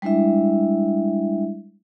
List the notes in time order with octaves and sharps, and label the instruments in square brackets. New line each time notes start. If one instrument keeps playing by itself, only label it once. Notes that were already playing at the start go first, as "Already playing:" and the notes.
[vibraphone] G3 G#3 D4 E4 E5